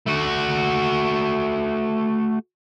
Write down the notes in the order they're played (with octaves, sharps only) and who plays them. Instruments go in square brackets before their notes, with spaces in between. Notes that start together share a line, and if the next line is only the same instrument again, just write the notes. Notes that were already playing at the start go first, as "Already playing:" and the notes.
[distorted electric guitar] A3 F#4